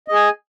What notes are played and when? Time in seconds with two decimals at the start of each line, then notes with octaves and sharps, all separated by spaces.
0.08 D#5
0.12 G#4
0.15 G#5